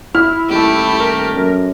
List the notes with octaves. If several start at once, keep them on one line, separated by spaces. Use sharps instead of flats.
E4 F6
D#1 A3 G4
A#4
F#2